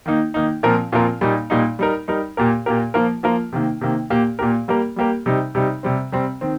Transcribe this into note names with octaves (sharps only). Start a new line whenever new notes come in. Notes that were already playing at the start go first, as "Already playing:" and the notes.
D#3 A#3 D#4
D#3 A#3 D#4
A#2 F3 C4 F4 A#4
A#2 F3 C4 F4 A#4
A#2 G3 A#3 D#4
A#2 G3 A#3 D#4
G3 D#4 A#4
G3 D#4 A#4
A#2 A#3 G4 A#4
A#2 A#3 G4 A#4
F3 A#3 F4 A#4
F3 A#3 F4 A#4
C3 D#3 A#3
C3 D#3 A#3
A#2 A#3 G4 A#4
A#2 A#3 G4 A#4
G3 A#3 G4 A#4
G3 A#3 G4 A#4
C3 G3 D#4
C3 G3 D#4
C3 G3 C4
C3 G3 C4
D#3 C4